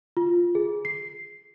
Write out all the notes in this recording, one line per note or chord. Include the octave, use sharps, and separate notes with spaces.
F4
G#4
C7